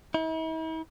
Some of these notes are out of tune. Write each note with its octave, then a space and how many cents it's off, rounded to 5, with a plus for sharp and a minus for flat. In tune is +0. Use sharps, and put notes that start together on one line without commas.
E4 -45